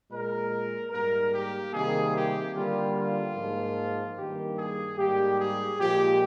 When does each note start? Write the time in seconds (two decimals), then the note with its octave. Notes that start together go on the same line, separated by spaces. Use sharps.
0.11 A#2 G#3 A#4
0.92 G#2 G3 A#3 A#4
1.32 G4
1.73 C3 D#3 G3 A#3 G#4
2.14 G4
2.54 D3 G3 A#3 F4
2.95 F4
3.35 G#2 F3 A#3
4.16 G2 D#3 G3 A#3 G4
4.58 G#4
4.98 G#2 G3 A#3 G4
5.38 G#4
5.79 A#2 F3 G#3 G4